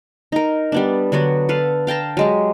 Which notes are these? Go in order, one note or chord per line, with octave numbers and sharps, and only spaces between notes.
D#4 A#4
G3 B3 D4
D3 F#3 B3 F#4
A4 B4 F5
F5 G5 A5 A#5
F#3 G#3 G4